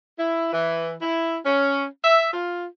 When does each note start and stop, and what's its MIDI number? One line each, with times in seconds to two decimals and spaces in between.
0.19 0.53 64
0.53 0.93 52
1.02 1.38 64
1.45 1.85 61
2.04 2.30 76
2.33 2.66 65